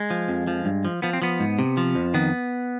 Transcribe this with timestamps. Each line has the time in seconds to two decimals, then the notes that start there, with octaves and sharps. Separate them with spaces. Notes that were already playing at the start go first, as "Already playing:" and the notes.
Already playing: G#3
0.10 F3
0.28 F2
0.47 F3
0.65 G2
0.85 F3
1.02 F3 B3
1.13 C4
1.22 F3 B3
1.40 G#2
1.59 C3
1.77 F3
1.95 F2
2.14 D#3 B3